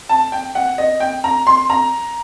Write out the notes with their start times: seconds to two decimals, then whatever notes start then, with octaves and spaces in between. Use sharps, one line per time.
0.09 A5
0.32 G5
0.55 F#5
0.78 D#5
1.00 G5
1.24 A#5
1.47 C6
1.70 A#5